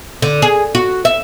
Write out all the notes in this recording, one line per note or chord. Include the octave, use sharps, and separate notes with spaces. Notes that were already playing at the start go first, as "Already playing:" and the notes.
D3
G#4
F#4
E5